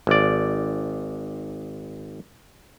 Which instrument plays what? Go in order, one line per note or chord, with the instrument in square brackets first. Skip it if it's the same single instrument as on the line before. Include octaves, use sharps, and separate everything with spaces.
[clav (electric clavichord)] G#1 D5